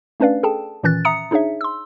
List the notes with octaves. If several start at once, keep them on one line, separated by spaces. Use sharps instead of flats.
A3 C#4 D4 B4 D5 F5
G#4 A4 G5 A5
A#2 D#3 E3 C#4 F#6 A6
E5 A#5 D#6 C#7
D4 D#4 G#4 C#5 E5
C6 E6